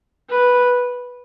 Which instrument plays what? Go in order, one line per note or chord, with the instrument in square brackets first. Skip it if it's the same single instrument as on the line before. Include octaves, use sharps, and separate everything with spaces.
[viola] B4